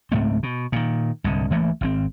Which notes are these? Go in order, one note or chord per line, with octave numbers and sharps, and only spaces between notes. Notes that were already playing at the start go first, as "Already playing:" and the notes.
C#2 G#2 A3 C4
B2
A#2 D#3
C2 G#2 D3
C#2 E3 A3 A#3
G#1 B2 C4